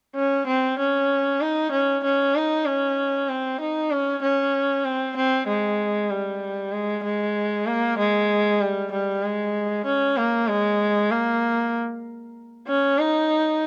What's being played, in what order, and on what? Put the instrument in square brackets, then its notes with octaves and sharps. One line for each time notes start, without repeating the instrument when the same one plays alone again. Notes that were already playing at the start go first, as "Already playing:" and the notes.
[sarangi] C#4
C4
C#4
D#4
C#4
C#4
D#4
C#4
C4
D#4
C#4
C#4
C4
C4
G#3
G3
G#3
G#3
A#3
G#3
G3
G3
G#3
C#4
A#3
G#3
A#3
C#4
D#4